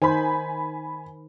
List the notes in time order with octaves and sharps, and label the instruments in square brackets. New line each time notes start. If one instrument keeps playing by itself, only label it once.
[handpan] D#3 D#4 C5 [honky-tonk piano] G#5 B5